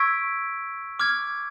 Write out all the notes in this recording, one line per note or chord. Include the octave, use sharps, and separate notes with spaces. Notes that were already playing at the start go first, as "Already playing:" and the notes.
Already playing: C#6 E6 G#6 B6 D7
D6 F6 G#6